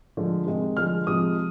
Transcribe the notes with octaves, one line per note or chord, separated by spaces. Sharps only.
D3 F3 G#3
C3 D#3 G#3
D3 F3 G#3 F6
C3 F3 G#3 D#6